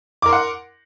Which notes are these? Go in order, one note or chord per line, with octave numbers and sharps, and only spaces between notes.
A#4 F#5 C6 D6